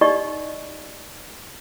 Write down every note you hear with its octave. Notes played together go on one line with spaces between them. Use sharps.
D#4 G4 D5 D#5 C#6